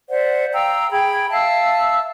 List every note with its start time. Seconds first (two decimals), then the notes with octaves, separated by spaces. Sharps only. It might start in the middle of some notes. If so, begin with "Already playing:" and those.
0.10 C5 D5 E5 F#5
0.53 F5 G5 A#5 E6
0.92 G#4 G5 B5
1.30 E5 F5 A5 E6